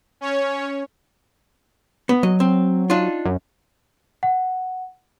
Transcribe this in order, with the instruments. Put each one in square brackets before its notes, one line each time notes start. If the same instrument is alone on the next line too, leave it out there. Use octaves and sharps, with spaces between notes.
[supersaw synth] C#4 C#5
[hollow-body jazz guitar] B3
[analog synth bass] F#3 [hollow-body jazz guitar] D#5
[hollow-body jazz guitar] C4
D4 D#4 F4
[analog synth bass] F#2
[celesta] F#5